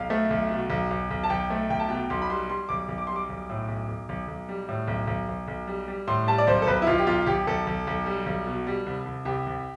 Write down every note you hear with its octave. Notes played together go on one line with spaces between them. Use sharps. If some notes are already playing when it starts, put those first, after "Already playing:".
Already playing: B1 F5
A3
B1
B2
B1
B1
B1
A5
B1 G5
A3
B1 G5
A5
B2 G5
B1 C6
B5
G3 C6
G3 C6
B1 D6
B1
D6
G3 C6
D6
B1
A2
B1
B1
B1
B1
G3
A2
B1
B1
B1
B1
G3
G3
A2 C6
G3 A5
D5
B1 C5
A4
B1 B4
E4
B1 F4
G4
B1 F4
B1 G4
B1 A4
B1
B1
G3
B1
B2
G3
C2
C2
C2 G4
C2